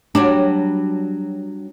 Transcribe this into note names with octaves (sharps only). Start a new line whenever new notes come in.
F#3 G3 D4